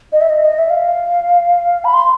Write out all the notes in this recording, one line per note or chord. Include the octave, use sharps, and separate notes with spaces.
D#5
E5
D#5
D#5
E5
F5
B5
C6